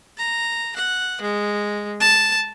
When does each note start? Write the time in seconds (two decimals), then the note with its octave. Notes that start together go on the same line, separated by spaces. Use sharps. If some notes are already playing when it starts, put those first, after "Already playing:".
0.18 A#5
0.76 F#5
1.21 G#3
2.01 A5